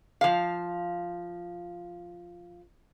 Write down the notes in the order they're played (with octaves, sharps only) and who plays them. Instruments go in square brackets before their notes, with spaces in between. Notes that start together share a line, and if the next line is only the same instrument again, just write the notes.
[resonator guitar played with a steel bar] F3 F5